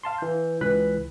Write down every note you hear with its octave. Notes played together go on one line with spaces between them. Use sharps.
F5 A5 C6
E3 G6
C#2 E3 B4 F#6 B6